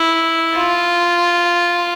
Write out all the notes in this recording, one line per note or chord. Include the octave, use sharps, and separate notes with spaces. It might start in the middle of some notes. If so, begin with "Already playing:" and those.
Already playing: E4
F4